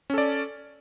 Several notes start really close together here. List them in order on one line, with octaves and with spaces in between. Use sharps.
C#4 A4 D5